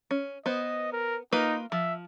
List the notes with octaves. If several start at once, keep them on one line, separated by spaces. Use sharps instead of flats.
C#4
B3 C5 D#5
A#4
A#3 D#4 F4 B4
F3 E5